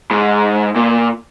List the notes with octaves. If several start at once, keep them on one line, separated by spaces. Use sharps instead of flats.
G#2
A#2